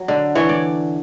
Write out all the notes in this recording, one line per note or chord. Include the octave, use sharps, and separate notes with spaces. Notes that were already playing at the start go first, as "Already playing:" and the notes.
Already playing: F#3
D3
E3 C#5
D5